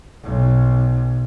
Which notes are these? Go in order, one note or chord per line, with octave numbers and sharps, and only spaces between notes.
B1